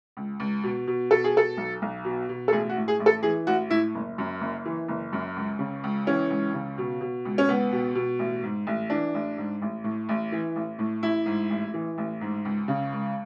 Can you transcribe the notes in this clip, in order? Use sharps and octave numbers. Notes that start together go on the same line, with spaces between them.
C#2
C#2
B2
B2
B2 A4
G#4
B2 A4
B1
B1
B2
B2
A4
A1 G#4
F#4
A2
G#4
A1
A4
E3 G#4
A1 F#4
A2 E4
F#1
F#2
F#1
E3
F#1
F#2
C#2
C#3
C#2
E3 C#4
C#2
C#3
B2
B2
C#2
C#4
C#2 B3
B2
B2
A1
G#2
A1
E3 D4
A1
G#2
A1
A2
A1
E3
A1
A2
A1 E4
G#2
A1
E3
A1
G#2
C#2
C#3
C#2